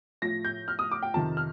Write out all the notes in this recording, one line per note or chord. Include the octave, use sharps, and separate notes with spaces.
A2 F3 A#6
G6
F6
D#6
D6
G5
F2 C3 D#3 A5
F6